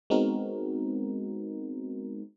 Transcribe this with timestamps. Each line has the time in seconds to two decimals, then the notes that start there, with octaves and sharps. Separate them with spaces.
0.10 G#3 B3 C4 D#4 F#4 A#4